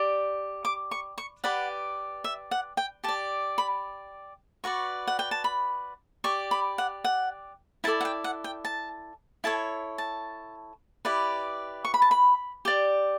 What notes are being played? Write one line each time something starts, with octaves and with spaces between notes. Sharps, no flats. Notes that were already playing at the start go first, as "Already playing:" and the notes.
Already playing: G4 D5
D6
C#6
C#6
G4 B4 D5 F#5
E5
F#5
G5
G4 D5 A5
B5
F#4 B4 D5 C#6
F#5
G5
A5
B5
G4 D5 C#6
B5
F#5
F#5
E4 A4 D5 A5
F#5
G5
F#5
G5
A5
E4 A4 C#5 A5
A5
E4 G4 B4 D5
C#6
B5
A5
B5
G4 D5